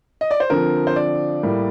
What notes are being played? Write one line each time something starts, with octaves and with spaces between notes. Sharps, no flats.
D#5
D5
C5
D3 F3 C4 A#4
C5
D5
A2 G3 A#3